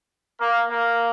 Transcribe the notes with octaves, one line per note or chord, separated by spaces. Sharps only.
A#3
A#3